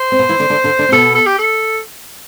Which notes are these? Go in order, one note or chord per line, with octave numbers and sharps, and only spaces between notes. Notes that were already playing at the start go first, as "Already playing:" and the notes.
Already playing: C5
C4
B2 B3
E3 E4
D3 D4
D3 D4
D3 D4
D3 D4
C4
B2 B3 A4
A4
G4
A4